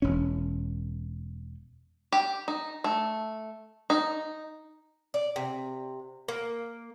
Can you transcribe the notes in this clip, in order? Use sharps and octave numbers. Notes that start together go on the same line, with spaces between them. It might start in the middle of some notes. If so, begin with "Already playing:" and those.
E1 C#4
G4
D#4
A3
D#4
D5
C3
A#3